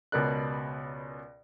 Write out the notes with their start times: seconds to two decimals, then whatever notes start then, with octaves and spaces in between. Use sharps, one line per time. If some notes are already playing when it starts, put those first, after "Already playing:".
0.12 C#2 B2 A#4 D5 F#6